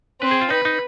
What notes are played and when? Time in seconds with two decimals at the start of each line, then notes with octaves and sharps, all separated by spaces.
0.21 C4 B4
0.31 G#4
0.41 F4
0.50 D#4 B4
0.65 D#4